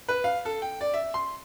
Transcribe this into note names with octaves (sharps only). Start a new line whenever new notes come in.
B4
F5
A4
G5
D5
E5
C6